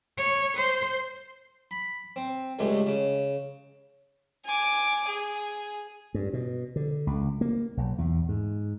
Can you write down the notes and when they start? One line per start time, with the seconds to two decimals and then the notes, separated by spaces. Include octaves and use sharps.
0.17 C#5
0.56 C5
1.71 B5
2.16 C4
2.59 C#2 G2 G#3 A3
2.87 C#3
4.45 G#5 D6
5.08 G#4
6.14 G2
6.33 B2
6.76 D3
7.07 C#2
7.41 A#3
7.77 B1
7.98 E2
8.29 G#2